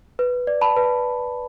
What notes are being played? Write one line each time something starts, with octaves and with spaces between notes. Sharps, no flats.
B4
D5
A5 B5
B4